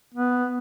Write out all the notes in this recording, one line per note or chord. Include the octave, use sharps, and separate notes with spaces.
B3